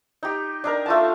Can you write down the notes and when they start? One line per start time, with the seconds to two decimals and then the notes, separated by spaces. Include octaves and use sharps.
0.23 D#4 G4
0.64 D4 D#4 A#4
0.86 A3 F4 A5